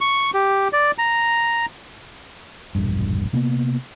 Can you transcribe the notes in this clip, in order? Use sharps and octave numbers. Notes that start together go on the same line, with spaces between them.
C#6
G4
D5
A#5
E1 A#1 G2
C3 A#3 B3